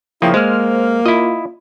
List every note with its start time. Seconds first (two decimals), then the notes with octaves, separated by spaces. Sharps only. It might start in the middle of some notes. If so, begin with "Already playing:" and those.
0.22 C#3 F3 A#3 E4 G5 D#6
0.34 G#3 A#3 C5 F6
1.06 E4 F4 D#5